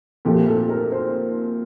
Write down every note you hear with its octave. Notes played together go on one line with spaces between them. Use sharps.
A#2 F3 A3 G4
A4
A#4
C5